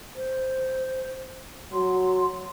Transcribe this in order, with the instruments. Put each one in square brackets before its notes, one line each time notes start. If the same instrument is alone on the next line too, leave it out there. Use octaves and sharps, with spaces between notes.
[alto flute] C5
[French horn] F#3 [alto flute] C6